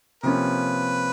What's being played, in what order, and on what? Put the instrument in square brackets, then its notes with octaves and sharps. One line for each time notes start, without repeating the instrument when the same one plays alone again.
[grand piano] C3 F3 A#3 C#4 [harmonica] B4